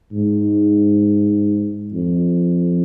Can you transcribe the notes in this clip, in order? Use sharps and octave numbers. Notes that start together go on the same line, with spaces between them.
G#2
F2